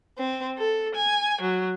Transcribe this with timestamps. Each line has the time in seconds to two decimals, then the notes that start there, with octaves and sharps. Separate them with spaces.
0.18 C4
0.58 A4
0.94 G#5
1.41 F#3